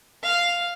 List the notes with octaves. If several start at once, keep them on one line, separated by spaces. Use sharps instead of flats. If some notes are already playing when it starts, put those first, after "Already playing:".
F5